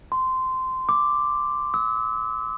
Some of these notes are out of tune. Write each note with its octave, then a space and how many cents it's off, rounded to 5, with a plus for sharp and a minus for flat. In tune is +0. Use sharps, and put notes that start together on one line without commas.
C6 -15
D6 +0
E6 -40